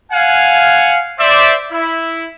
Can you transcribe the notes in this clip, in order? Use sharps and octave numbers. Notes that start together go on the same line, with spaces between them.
F5 F#5 G#5
C5 D5 E5
E4